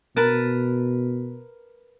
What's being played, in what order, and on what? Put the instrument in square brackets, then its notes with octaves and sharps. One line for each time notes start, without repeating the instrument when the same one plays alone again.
[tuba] B2 [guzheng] A#4 B4 A5